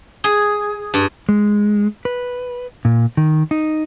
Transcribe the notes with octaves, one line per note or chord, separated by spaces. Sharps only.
G#4
G2
G#3
B4
A#2
D#3
D#4